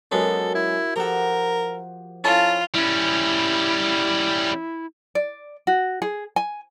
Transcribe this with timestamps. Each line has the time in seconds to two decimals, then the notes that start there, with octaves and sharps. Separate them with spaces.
0.12 F#2 G#3 B3 F#4 G4 A4 A#4
0.55 E4
0.96 F3 G4 A4 A#4 F#5 A#5
2.24 C#4 E4 F4 A4 A5 A#5
2.74 G3 C#4 E4
5.15 D5
5.67 F#4
6.02 G#4
6.36 G#5